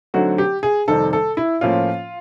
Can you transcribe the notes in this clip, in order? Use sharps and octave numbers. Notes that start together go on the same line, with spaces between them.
D3 F#3 A3 C4 D#4 F#4
G4
G#4
F2 C3 D#3 G3 C4 A4
A4
E4
A2 F3 A#3 C#4 F4